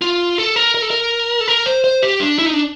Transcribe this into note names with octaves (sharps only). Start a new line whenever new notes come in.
F4
A4
A#4
A#4
A4
A#4
A4
A#4
C5
C5
G4
D4
E4
D#4
D4